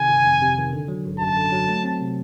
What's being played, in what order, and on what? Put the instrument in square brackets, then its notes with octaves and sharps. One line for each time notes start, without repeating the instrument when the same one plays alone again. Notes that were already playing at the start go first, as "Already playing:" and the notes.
Already playing: [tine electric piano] C3 D#3 [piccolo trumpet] G#5
[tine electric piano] G1
F2
C3
D#3
D3
F#3
G#1
[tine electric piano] F#2 [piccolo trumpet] A5
[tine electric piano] D3
F#3
A3
C4
C3